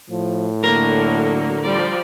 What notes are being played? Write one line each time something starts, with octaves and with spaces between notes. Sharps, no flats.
A2 F3
D3 F#3 A#3 A#4
F3 G3 D5